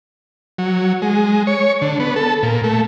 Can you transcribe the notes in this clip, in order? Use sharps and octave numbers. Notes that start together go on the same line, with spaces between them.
F#3
G#3
C#5
D3
B3
A4
A#2
A3